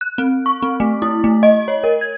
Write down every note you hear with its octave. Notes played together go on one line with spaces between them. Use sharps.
F#6
C4
C#6
C4
A3
E4
A3
D#5
C#5
A#4
G#6